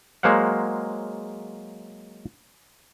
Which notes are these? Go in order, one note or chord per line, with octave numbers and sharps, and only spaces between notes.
F#3 G#3 A#3 C5 F5 F#5